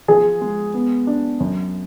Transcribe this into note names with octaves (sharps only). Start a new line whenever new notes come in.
F3 G#4
G#3
B3
D4
F#2